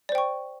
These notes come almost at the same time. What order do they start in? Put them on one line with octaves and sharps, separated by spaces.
D5 C5 G5 C#6